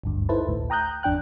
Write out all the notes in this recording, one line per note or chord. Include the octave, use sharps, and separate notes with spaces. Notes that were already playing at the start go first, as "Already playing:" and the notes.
G#1 D2 G2
D#4 E4 A4 B4 C5 A5
A1 D2 A2
G5 A#5 D#6 F#6 G6
G#1 F2 D4 G5 F#6